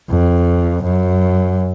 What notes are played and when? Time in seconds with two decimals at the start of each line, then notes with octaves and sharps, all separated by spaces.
0.09 F2
0.83 F#2